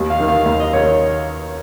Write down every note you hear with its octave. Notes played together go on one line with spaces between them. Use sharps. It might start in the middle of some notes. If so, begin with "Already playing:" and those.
Already playing: D#2
F5
D#3 A#3
F5
D#2 F5
D#5
D#3 A#3 C#5